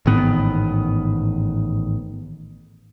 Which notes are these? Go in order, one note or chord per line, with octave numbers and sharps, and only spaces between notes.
A1 G#2 D#3 B3